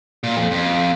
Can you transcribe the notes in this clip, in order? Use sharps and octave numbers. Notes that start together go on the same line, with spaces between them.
A#2
F2
F2